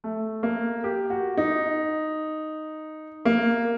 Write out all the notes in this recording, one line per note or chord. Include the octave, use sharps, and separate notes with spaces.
A3
A#3
G4
F#4
D#4
A#3